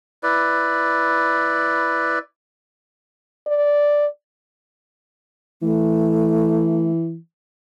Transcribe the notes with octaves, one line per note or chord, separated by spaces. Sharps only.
E4 B4 D5
D5
E3 A3